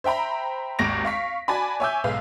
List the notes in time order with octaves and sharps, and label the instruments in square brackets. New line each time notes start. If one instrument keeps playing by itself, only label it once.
[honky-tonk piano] C5 E5 G5 A#5 B5
G#1 D#2 C#6 A#6 D7 F7
F5 C#6 B6
F#4 D5 G#5 A5 B5
C#5 E5 G#5 D6 E6 G6
B1 G#2 B4 F5